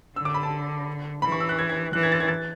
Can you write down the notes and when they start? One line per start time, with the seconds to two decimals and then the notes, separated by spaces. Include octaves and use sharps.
0.16 D3 E6
0.25 D6
0.34 B5
0.43 A5
1.22 E3 B5
1.32 C#6
1.40 E6
1.49 F#6
1.59 G#6
1.69 G#6
1.93 E3 F#6
2.03 G#6
2.12 A6
2.20 G#6
2.29 A6